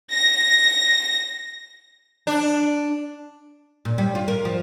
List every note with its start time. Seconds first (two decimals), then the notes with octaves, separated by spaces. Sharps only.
0.12 A#6
2.27 D4
3.85 A#2
3.98 G3
4.15 F4
4.28 A#4
4.45 F3